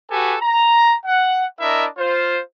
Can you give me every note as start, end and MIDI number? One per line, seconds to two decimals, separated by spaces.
0.10 0.36 66
0.10 0.36 67
0.10 0.36 69
0.10 0.36 71
0.10 0.36 80
0.41 0.94 82
1.05 1.43 78
1.60 1.86 62
1.60 1.86 64
1.60 1.86 70
1.60 1.86 75
1.60 1.86 76
1.98 2.40 65
1.98 2.40 72